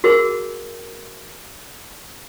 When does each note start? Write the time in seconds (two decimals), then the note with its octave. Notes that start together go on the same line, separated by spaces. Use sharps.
0.04 F#4 G#4 A#4